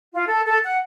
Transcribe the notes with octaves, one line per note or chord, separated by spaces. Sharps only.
F4
A4
A4
F#5